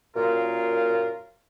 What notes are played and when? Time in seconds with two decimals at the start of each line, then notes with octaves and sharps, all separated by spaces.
0.16 F#2 A#2 F4 A#4 F5